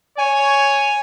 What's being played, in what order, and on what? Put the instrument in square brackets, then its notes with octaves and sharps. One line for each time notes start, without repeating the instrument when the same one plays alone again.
[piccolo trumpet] C#5 [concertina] G#5